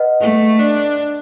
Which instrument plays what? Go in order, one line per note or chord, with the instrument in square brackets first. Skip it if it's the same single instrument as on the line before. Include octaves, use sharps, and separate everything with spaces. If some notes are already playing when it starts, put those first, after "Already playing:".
Already playing: [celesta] B4 D#5 F#5
[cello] A3
D4